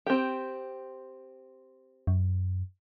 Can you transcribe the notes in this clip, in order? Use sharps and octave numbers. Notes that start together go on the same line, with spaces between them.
C4 G4
F#2